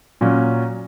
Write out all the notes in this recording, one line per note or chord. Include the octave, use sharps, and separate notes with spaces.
A#2 F#3 C#4